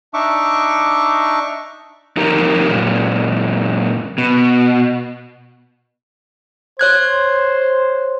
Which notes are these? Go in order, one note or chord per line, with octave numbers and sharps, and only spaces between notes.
D4 D#4 E5 C#6 D6
F2 D#4 G4 A#4
F#2 A#2
B2
C5 C#5 F#6 G#6